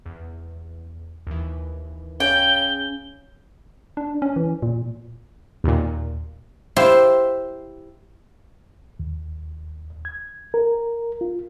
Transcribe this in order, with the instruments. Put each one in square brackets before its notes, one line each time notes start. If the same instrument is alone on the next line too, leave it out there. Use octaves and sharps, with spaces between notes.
[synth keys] E2
D#2 E3
[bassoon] C#3 [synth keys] C#4 [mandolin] G5 [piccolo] G7
[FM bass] D4
C#4
E3
A#2
[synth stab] D#2 A#2
[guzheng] E4 G4 C5 E5 F5
[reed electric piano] D#2
G#6
A#4
F4